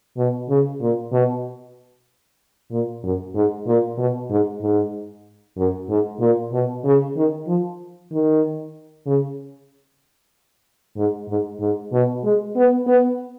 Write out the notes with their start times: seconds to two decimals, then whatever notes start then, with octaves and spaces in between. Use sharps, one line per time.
0.17 B2
0.49 C#3
0.81 A#2
1.12 B2
2.71 A#2
3.04 F#2
3.34 G#2
3.67 A#2
3.98 B2
4.30 G#2
4.62 G#2
5.57 F#2
5.89 G#2
6.20 A#2
6.52 B2
6.84 C#3
7.16 D#3
7.47 F3
8.12 D#3
9.06 C#3
10.97 G#2
11.28 G#2
11.60 G#2
11.92 B2
12.24 G#3
12.56 B3
12.87 B3